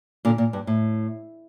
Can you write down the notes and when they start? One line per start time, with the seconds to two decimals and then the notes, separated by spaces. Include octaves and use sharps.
0.25 A#2 D3
0.38 A#2
0.53 G2
0.67 A2